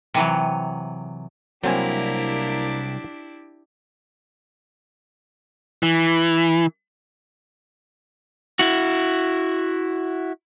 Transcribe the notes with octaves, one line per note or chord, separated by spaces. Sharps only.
C3 E3 F#3
C2 F#3 A#3 C4 D4 E4 G4 G#5
E3
E4 F#4